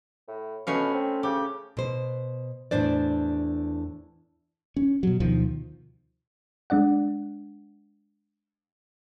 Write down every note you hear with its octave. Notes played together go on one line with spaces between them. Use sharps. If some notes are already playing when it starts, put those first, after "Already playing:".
A2
B2 A3 C#4 F5
C4
C#3 G4
B2 C5
E2 A2 D4 C5 D5
C#4
B2 F#3
D2 B2 D#3 F3
G#3 D4 D5 F#5